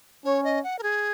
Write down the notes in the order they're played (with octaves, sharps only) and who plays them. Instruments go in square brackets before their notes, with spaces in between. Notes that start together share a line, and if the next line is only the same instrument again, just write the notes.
[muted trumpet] C#4 [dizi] C#5
[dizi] D#5
F#5
A#4
G#4